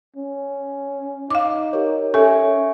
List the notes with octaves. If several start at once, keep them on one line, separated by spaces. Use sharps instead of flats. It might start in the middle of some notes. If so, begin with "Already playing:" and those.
C#4
D#4 F5 D6
G4 A#4 C#5
C#4 A4 E5 G#5 C#6